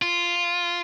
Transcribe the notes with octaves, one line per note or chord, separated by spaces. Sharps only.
F4